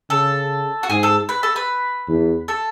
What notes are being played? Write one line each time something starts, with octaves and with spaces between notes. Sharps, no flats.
C#3 A4
F#4
G#2 G#4
A4
B4
A4
B4
E2
A4